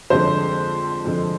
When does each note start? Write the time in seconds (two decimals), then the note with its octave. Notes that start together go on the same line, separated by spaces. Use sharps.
0.10 F2 D3 G#3 C5
1.05 F2 D3 G#3